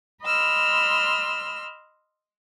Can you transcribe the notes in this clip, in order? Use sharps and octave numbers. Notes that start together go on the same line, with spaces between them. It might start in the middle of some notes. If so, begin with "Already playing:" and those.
D#5 B5 C6 E6 F6